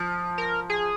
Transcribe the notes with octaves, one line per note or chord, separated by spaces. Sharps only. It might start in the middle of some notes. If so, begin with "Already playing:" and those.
Already playing: F3
A#4
G#4